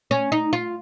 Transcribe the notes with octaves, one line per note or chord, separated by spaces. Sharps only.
C#4
D#4
F4